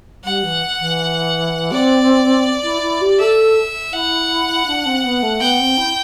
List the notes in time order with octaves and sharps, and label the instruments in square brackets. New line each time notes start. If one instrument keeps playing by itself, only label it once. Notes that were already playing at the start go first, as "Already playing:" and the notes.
[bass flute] G3 [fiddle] F#5
[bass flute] E3
E3
[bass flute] C4 [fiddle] D5
[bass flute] E4
E4
G4
[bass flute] A4 [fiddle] E5
[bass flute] E4 [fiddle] F#5
[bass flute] D4
C4
B3
A3
[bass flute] B3 [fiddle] G5
[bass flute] C4
E4